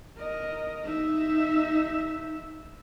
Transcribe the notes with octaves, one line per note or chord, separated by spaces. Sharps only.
A#4 D#5
D#4 E5